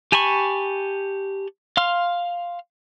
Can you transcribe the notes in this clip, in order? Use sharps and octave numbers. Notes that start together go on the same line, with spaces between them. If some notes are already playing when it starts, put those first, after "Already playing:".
G4 G#5 A5 B5 C#6
F5 C6 F6